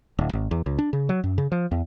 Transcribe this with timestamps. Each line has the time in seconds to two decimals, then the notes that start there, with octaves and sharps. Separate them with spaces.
0.19 D1
0.33 G#1
0.51 E2
0.66 C#2
0.79 D4
0.93 C#3
1.09 F#3
1.24 F#2
1.38 C#3
1.52 F3
1.71 E2